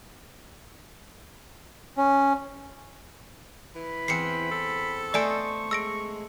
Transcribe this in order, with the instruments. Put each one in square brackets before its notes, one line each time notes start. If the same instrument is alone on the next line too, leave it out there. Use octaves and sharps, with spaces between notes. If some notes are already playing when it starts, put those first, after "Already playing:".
[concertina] C#4
[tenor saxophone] E3 [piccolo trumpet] B5
[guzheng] E2 C4 [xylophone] C7 C#7
[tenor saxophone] A4
[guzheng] A3 C5 D#5 [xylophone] D5 G#5 [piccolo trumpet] C#6
[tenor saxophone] G#3 [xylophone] E6 A#6 D7